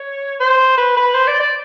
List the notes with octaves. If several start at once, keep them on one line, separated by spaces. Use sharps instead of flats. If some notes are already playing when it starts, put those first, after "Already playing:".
Already playing: C#5
C5
B4
B4
C5
D5
D5